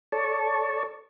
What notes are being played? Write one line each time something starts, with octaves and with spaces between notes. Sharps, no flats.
A4 C#5 D5 A5 C#6